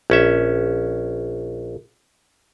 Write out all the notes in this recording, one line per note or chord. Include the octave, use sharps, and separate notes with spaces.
A#1 C#4 E5